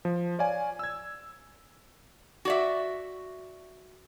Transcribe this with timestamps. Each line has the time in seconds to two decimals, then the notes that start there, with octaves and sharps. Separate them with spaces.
0.05 F3
0.39 C#5 D5 F5 G#5
0.79 E6 G#6
2.45 F#4 D5 E5